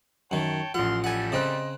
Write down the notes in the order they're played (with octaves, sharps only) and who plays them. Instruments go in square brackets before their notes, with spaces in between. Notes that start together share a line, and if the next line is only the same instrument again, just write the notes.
[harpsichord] F#2 D#3 [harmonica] C#5 G5 A5
[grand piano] A1 F3 [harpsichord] F#5 [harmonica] C6 F6
[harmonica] G3 A3 [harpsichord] F#5 G#5
[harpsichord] C#3 C4 [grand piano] D#5 C6 F#6